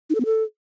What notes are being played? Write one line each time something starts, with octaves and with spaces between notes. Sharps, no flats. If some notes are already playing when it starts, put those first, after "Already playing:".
D#4
A4
B3
A4